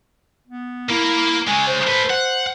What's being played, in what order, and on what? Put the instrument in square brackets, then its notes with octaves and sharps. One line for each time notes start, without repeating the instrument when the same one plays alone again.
[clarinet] B3
[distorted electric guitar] A#3 A#4 [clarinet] E4
[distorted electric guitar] C#3 G#3 [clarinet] G#5
[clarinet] C5
[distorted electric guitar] A3 B4
F#5